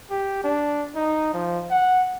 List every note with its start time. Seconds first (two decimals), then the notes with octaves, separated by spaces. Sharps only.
0.10 G4
0.44 D4
0.95 D#4
1.34 F3
1.71 F#5